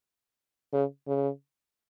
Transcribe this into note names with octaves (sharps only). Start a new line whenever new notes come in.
C#3
C#3